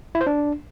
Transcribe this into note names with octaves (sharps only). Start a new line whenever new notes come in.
E4
C5
D4